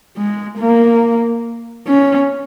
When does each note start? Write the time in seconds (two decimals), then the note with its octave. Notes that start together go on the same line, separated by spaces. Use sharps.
0.17 G#3
0.58 A#3
1.87 C#4